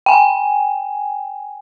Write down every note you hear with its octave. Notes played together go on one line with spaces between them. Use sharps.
G5 G#5